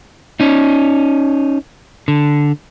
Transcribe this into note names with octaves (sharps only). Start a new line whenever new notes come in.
C#4 D#4
D3